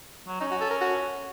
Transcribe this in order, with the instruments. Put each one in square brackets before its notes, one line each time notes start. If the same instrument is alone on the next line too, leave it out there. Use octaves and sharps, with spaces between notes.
[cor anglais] F#3
[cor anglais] C#4 [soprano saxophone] D#4
[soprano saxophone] F#4
A4
A#4
F#4